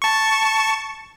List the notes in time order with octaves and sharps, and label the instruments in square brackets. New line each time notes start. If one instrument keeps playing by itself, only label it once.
[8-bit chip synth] A5 C#6